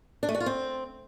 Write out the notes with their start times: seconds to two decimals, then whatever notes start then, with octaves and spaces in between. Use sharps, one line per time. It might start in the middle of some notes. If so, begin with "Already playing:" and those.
0.23 D4
0.29 A3
0.35 F#4
0.40 F4
0.46 C4